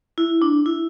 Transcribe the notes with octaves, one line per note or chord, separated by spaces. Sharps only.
E4
D4
E4